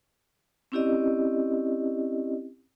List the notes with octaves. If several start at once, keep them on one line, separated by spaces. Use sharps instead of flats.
C4 C#4 E4 G4 D5 D#5